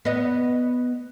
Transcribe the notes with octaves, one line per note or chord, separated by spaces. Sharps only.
B3 D#5